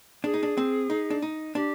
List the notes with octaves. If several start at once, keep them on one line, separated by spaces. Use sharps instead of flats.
D4 G#4
D#4
D4
C4
D#4
D4
D#4
D4 G4